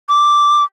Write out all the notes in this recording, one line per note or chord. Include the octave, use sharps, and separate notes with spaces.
D6